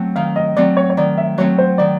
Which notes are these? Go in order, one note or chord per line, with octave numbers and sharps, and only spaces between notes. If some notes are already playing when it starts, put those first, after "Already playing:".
Already playing: F#3 A3 C4
D#3 F5
D#5
F#3 A3 C4 D5
C#5
C#5
D#3 D5
E5
F#3 A3 C4 C#5
C5
D#3 D5